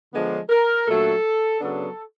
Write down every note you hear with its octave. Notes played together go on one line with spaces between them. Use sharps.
D3 F3 G#3 B3 D4
A#4
A#2 F#3 A3 D4 A4
C#3 F#3 B3 D4 A4